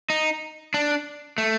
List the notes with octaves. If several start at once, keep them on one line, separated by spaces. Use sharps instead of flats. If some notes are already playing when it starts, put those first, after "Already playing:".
D#4
D4
A3